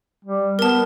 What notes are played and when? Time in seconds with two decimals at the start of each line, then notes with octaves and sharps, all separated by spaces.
0.25 G3
0.59 B3 A#4 A5